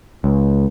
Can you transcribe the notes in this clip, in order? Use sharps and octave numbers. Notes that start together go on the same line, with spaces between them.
C#2